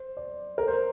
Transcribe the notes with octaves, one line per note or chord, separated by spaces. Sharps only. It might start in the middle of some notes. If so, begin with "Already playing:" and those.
Already playing: C5
D5
A#4
C5